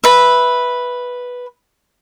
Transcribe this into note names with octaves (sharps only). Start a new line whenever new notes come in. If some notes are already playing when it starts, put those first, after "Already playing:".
B4 E5